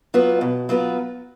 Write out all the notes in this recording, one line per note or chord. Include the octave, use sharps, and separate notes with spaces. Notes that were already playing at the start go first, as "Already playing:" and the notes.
F#3 B3 F4 B4
B2
F#3 B3 F4 B4